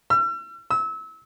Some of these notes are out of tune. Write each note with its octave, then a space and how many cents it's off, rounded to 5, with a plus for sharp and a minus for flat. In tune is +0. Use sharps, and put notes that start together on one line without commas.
E6 +45
E6 -30